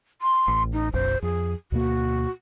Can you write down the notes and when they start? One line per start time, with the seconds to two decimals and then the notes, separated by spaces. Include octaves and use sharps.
0.22 C6
0.48 A1
0.73 D#4
0.93 F#1 B1 F#2 C5
1.22 F2 G#4
1.72 D2 B2 A#3 F#4